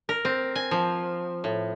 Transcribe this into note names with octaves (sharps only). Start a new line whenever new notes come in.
A#4
C4
G#5
F3
A2